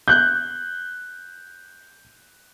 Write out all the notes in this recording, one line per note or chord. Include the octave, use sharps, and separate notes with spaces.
F#6 G6